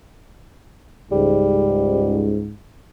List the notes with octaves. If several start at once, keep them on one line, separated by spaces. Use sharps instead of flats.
C#2 G#2 G3